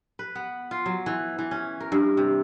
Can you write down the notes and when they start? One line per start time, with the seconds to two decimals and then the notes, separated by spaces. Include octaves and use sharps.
0.19 B4
0.35 B3
0.71 F4
0.86 F#3
1.06 E3
1.39 E3
1.51 C#4
1.81 A#4
1.92 G2
2.17 C3